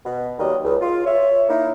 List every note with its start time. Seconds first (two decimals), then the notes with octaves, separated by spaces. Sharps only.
0.05 B2
0.38 D#2 D#3 F#3 G3 D#5
0.64 C#2
0.81 F4
1.05 C#5 E5
1.49 A#3 D#4 E4